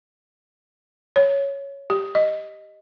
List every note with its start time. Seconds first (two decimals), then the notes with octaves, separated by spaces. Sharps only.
1.16 C#5
1.90 G4
2.15 D#5